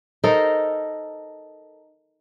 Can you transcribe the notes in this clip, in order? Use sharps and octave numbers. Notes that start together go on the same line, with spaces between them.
D#4 A4 A#4 C5